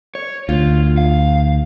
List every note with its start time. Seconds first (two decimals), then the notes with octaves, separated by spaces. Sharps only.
0.15 C#5
0.49 D2 F4
0.98 F5